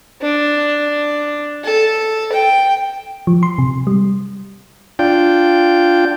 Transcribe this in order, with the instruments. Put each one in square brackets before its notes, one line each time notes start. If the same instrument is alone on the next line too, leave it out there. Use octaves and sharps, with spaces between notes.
[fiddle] D4
A4
G5
[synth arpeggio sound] F3
C6
C3
G3
[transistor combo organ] D4 F4 G5